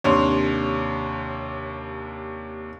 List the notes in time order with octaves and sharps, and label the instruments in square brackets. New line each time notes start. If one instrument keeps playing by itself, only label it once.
[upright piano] D#2 C3 C#5 [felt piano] D4 C6